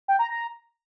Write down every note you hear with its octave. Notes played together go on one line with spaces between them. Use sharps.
G5
A#5
A#5